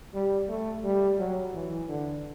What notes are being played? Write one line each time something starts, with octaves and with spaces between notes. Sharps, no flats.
G3
A3
G3
F#3
E3
D3